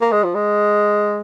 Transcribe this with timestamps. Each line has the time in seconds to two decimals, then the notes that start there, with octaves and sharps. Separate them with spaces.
0.01 A#3
0.12 G#3
0.23 F3
0.35 G#3